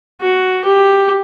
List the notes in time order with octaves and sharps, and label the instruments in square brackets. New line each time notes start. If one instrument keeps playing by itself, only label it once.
[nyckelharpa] F#4
G4